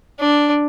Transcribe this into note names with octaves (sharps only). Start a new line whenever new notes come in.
D4